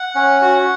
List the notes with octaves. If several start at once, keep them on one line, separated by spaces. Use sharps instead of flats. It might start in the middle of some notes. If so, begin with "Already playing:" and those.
Already playing: F#5
C#4
F#4